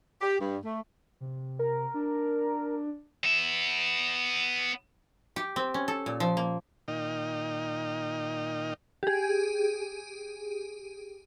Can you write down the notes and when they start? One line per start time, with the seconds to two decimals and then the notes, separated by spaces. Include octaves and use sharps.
0.21 G4
0.39 G2
0.64 A3
1.21 C3
1.59 A#4
1.94 D4
3.24 B3 E5
5.36 G4
5.56 C4
5.74 C#4
5.88 A4
6.06 A#2
6.20 F3
6.37 A#3
6.88 A#2 D#3 D#4 D#5 G5 F6
9.03 G4 G#4